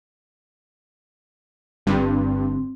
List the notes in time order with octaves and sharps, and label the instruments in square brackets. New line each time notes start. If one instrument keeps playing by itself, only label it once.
[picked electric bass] G1 [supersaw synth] G2 [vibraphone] C4